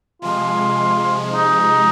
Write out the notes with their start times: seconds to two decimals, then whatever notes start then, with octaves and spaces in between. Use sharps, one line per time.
0.22 C3 F3 G#3 F4
1.33 D#4